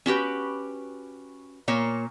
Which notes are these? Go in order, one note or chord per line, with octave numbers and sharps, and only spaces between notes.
C#4 F#4 G4 B4
A#2 A#3 C#5